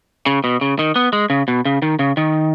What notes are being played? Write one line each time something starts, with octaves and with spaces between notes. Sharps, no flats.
C#3
B2
C#3
D#3
B3
G#3
C#3
B2
C#3
D#3
C#3
D#3